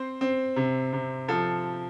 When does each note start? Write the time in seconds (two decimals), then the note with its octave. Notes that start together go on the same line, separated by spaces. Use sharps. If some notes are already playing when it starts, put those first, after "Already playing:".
Already playing: C4 C5
0.21 C4
0.56 C3
0.93 C3
1.28 F3 A4